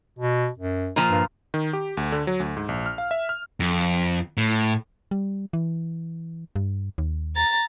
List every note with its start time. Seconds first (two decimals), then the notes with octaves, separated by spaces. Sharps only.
0.19 B2
0.58 F#2
0.96 A#2 F3
1.09 G2
1.54 D#3
1.73 G4
1.97 D2
2.12 D3
2.27 F#3
2.40 D2
2.57 G#2
2.69 A#1
2.86 F6
2.98 F5
3.11 E5
3.29 F6
3.60 F2
4.37 A2
5.11 G3
5.53 E3
6.56 G2
6.98 D#2
7.36 A#5 A6